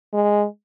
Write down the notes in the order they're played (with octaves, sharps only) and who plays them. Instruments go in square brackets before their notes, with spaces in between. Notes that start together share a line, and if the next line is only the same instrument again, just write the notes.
[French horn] G#3